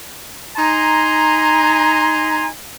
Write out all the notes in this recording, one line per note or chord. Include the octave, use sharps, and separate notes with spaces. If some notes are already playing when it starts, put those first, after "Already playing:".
D#4 G#5 A#5 C6